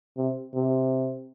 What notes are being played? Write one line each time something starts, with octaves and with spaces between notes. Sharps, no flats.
C3
C3